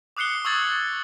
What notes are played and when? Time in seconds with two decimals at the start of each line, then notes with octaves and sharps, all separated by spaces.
0.17 D6 D#6 F#6 C7 C#7 G7
0.45 C#6 D#6 E6 G#6 A6 F#7